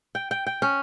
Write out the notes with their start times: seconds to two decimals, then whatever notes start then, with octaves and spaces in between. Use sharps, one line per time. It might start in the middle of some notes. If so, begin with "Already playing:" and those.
0.15 G5
0.31 G5
0.46 G5
0.62 C#4